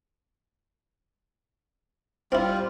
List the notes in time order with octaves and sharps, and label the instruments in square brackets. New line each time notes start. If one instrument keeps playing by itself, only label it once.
[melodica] G3 F4 [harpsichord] C4 E4